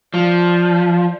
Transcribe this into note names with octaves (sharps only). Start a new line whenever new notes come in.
F3 D5